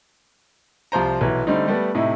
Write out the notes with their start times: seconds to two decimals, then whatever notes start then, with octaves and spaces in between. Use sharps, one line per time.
0.92 C2 F3 C5 A#5
1.21 B1 E3
1.47 D3 G3 A3 C4 D#4
1.68 G3 A3 B3
1.95 A2 C3 D#4 E4